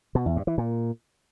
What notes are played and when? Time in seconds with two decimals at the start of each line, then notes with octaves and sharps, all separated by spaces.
0.15 B2
0.26 E2
0.36 G2
0.47 E3
0.58 A#2